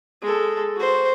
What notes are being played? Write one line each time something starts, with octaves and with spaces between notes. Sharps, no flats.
G#3 A4
F#4 C5